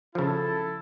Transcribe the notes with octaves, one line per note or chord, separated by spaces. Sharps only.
C#3 F3 E4 A4